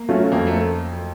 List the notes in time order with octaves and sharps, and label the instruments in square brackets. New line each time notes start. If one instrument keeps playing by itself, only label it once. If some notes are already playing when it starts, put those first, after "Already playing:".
Already playing: [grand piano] A#3
[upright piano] F#3 A3 C#4 F4
[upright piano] F2 [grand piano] A#3
[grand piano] A3